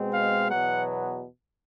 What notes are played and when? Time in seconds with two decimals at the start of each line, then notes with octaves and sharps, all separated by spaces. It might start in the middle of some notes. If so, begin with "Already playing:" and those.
Already playing: B2 G#3 C4
0.14 F5
0.50 E2 B2 F#3 B3 F#5